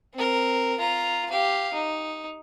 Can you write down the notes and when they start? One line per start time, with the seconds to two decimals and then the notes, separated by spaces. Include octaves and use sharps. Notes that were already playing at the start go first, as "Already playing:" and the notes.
0.14 C4 A#4
0.79 F4 A#5
1.30 G4 F5
1.73 D#4